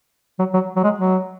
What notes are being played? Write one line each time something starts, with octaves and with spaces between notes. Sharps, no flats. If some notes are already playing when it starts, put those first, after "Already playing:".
F#3
F#3
F#3
G#3
F#3